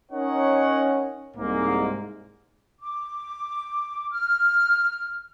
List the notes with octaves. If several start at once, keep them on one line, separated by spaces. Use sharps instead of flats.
C#4 D#4 A#4 C#5 D#5 F#5
C2 G#2 A#3
D6
F6